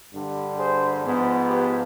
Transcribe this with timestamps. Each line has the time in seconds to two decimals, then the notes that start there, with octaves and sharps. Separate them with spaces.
0.11 G2 D3 G3
0.57 G#4 C5
1.04 G#2 F3 B3
1.49 G4 B4